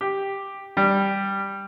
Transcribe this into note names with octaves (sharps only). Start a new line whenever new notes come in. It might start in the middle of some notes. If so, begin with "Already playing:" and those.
G4
G3